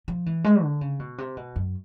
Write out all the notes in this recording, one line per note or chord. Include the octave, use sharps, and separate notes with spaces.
F3
E3
G#3
D3
C#3
B2
C3
B2
F#2